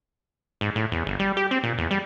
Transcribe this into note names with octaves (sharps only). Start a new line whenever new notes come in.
G#2
A2
E2
G1
G3
G4
C4
A#2
E2
G3